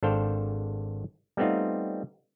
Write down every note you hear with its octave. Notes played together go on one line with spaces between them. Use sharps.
G#1 D4 A4 C5 F5 G5
G3 A3 B3 C4 D#4 F4